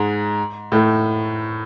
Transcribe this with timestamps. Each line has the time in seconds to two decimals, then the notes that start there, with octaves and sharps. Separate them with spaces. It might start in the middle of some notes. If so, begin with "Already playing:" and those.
Already playing: G#2 G#3
0.72 A2 A3